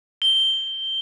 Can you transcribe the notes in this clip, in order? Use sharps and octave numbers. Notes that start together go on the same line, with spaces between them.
G7